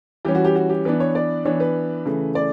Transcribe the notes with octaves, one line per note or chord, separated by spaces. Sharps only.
E3 G3 C#4 G4
F#4
G4
F#4
G4
E3 B3 D4 B4
C#5
D5
E3 B3 D4 C#5
B4
C#3 E3 A3
D5